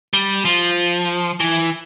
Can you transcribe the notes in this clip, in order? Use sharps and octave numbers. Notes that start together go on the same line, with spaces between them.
G3
F3
E3